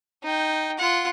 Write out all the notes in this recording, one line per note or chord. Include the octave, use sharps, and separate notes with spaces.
D#4 G5
F4 F#5